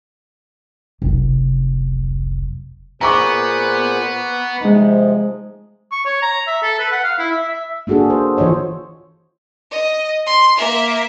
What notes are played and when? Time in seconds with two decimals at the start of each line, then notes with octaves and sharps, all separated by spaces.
1.02 F1 B1
3.01 A#2 B3 G#4 C5 A#5 C#6 D6
4.60 C3 F3 G#3 D#4
5.92 C#6
6.06 C#5
6.22 A#5
6.47 E5
6.63 A4
6.79 B4
6.92 F#5
7.04 F5
7.19 E4
7.31 E5
7.49 E5
7.87 A#3 D4 F#4 G#4 A4
8.10 C5
8.37 E3 F4 C5 C#5 D#5
9.72 D#5
10.27 C6
10.57 A#3 E5